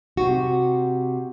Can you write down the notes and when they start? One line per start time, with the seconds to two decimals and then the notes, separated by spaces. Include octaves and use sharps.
0.17 C3 F#4